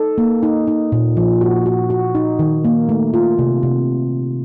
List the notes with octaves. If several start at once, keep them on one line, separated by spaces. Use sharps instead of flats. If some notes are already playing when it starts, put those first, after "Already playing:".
Already playing: D#4 A4
A#3
D#4
D#4
A#2
F3
F#4
F#4
F#4
D#4
D#3
A#3
A3
F4
C3
C3